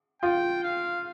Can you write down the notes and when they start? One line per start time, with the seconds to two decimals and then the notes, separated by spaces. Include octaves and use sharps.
0.22 F4 G5
0.63 F5